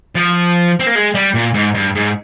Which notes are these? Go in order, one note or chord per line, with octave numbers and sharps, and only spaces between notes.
F3
C4
A#3
G#3
G3
A#2
G#2
G2
G#2